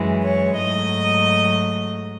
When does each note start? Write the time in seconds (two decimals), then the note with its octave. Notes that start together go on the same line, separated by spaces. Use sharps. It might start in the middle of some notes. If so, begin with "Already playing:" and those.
Already playing: F#2 E3 G#3
0.24 C#5
0.58 G#2 F#3 A3 D#5